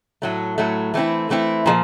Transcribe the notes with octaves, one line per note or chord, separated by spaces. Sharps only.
A2 F#3 A3
A2 F#3 A3
E3 A3 C4 E4
E3 A3 C4 E4
A#2 F3 G#3